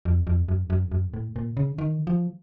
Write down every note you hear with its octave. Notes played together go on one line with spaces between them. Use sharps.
F2
F2
F#2
F#2
F#2
A2
A#2
C#3
D#3
F3